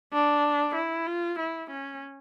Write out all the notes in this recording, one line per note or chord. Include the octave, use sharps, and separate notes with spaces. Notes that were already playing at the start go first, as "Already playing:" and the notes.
D4
E4
F4
E4
C#4